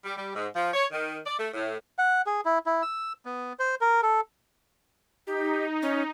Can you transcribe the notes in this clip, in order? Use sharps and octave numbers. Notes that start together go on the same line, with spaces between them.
G3
G3
G#2
F3
C#5
D#3
D5
A3
A2
F#5
G#4
E4
E4
E6
B3
C5
A#4
A4
D#4 G4
C#4